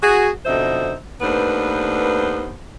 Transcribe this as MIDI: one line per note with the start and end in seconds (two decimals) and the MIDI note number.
0.02 0.29 66
0.02 0.29 68
0.45 0.94 41
0.45 0.94 47
0.45 0.94 50
0.45 0.94 63
0.45 0.94 72
0.45 0.94 76
1.21 2.56 39
1.21 2.56 57
1.21 2.56 59
1.21 2.56 62
1.21 2.56 71
1.21 2.56 72